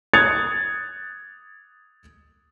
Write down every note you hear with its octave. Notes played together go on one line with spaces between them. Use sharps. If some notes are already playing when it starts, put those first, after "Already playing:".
D#6 F#6 G#6 A6 C#7 F7